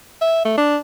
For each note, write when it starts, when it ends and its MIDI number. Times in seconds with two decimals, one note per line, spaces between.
0.21 0.43 76
0.45 0.57 57
0.57 0.78 62